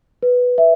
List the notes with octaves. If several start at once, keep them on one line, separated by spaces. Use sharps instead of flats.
B4
E5